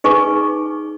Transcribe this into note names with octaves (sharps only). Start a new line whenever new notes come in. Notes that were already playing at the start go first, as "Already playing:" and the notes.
D#4 G#4 B4 G#5 C#6